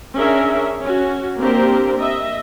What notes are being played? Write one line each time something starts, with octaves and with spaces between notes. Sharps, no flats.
C#4 D4 G#4 A#4 E5
C#4 F#4
A#3 C4 D4 G4 A#4 C5
D#5 E5